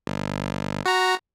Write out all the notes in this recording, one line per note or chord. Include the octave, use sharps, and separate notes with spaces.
G1
F#4 A#5